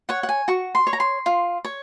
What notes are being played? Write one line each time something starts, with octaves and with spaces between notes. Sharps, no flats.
C#5 F#5
F#5
G#5
F#4 C#6
C6
C#5
A#5
C6
F4
C#5